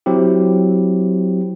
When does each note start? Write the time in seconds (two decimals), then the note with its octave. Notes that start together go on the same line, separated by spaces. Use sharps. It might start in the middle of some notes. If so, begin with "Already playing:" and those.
0.06 F#3 C4 E4 G4